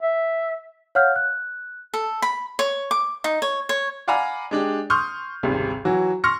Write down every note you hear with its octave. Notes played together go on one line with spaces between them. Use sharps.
E5
C#5 F5 F#5 F6 G6
F#6
A4
B5
C#5
D6
D#4
C#5
C#5
D5 F5 F#5 G#5 A#5 B5
G#3 D4 G4
C6 C#6 D#6 F6 G6
G#1 C#2 C3 G3
E3 F#3 F#4
C6 C#6 F6 A#6 C#7